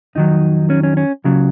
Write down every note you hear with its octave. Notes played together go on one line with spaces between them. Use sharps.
F2 D#3 F#3 D#4
C#4
C#4
C#4
C#2 C#3 F#3